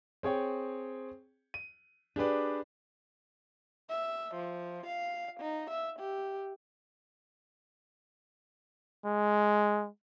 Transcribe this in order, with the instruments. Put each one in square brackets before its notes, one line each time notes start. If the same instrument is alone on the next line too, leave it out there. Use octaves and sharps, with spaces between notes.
[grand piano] C4 G#4 C#5 G5
D#7
D4 G4 G#4 B4 D5
[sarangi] E5
F3
F5
D#4
E5
G4
[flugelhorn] G#3